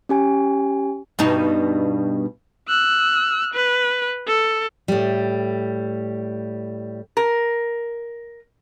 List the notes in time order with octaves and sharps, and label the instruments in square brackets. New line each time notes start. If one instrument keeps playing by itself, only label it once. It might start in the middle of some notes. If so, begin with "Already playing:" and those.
[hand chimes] C#4 G4 G#5
[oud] G2 B2 D#4
[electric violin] E6 F#6
B4
A4
[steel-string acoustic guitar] A2 G3
[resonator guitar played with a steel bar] A#4